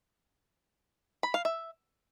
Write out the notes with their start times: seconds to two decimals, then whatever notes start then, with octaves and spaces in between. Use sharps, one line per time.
1.23 B5
1.34 F5
1.45 E5